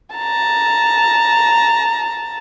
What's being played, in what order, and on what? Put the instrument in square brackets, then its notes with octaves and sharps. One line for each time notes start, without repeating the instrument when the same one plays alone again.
[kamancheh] A5 A#5